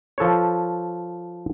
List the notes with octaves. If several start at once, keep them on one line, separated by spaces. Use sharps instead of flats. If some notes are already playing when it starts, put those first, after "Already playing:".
F3 A4 B4 C#5